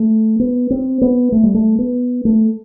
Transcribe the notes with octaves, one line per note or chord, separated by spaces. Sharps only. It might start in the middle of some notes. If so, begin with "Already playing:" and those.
Already playing: A3
B3
C4
B3
A3
G3
A3
B3
A3